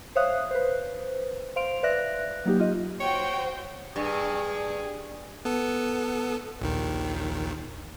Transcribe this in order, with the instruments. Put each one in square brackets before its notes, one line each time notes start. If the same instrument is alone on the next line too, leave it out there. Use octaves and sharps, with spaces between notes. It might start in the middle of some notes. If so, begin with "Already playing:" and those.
[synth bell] C5 C#5 E5 F5 D#6 F#6
B4 C5
C5 F5 C6 D7 F7
B4 D5 E5 F#6 A#6
F#3 A#3 D#4 G4
F4 G4 D#5
[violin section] F#4 C5 G5 [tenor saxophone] C#5
[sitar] G2 [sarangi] G#4
[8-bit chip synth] B3 A4
A#1 D#2 D#3